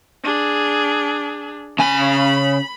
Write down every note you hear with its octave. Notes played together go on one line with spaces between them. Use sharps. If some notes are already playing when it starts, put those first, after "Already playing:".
D4 G#4
C#3 G#5 B5